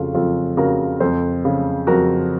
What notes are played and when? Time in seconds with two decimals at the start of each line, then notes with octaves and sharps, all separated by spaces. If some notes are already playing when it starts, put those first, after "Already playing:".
Already playing: F2 C#3 F4 F#4 A4
0.14 F2 F4 A4
0.57 C#3 F#4 A#4
1.00 F2 A4 C5
1.45 C#3
1.87 F2 F#4 A#4